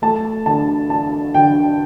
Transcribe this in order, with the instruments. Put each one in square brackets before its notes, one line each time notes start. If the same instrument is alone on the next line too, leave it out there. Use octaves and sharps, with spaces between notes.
[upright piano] A3 A5
D3 A5
D4 A5
D3 G5